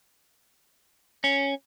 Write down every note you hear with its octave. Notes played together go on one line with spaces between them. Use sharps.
C#4